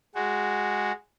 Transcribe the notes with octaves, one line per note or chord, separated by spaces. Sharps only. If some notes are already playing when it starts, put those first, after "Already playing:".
G#3 F#4